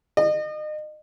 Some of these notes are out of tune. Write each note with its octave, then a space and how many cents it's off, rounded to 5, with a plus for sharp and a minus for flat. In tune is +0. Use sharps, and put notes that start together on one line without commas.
D#5 -35